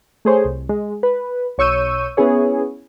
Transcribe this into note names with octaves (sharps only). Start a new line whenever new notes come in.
A3 G#4 C5 C#5
C2
G#3
B4
B1 C#5 C#6 E6 G6 D#7
B3 C#4 E4 G#4 C#5